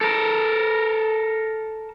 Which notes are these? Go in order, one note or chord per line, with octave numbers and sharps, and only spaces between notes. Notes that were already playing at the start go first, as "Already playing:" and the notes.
A4 A#4